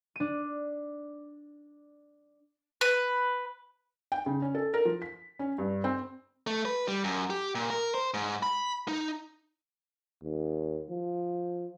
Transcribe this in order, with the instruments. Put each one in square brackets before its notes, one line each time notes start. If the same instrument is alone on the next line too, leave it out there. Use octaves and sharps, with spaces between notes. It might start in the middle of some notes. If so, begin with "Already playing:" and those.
[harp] D4 D#7
[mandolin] B4
[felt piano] G5
C#3
C#4
A4
A#4
F3
B6
C#4
G2
C4
[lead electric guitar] A3
B4
G3
F#2
G4
A#2
A#4
C5
G#2
B5
D#4
[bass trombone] D#2
F3